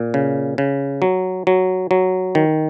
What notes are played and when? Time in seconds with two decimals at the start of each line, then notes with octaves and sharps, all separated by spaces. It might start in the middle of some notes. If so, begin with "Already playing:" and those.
Already playing: A#2
0.14 C#3
0.58 C#3
1.02 F#3
1.47 F#3
1.91 F#3
2.35 D#3